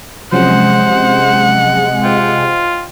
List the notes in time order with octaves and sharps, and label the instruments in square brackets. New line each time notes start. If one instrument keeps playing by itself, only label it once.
[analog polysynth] C3 G#3 [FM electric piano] F3 F#3 C#4 [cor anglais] C5 [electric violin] F#5
[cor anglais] F4 [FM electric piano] C5 D#5 G5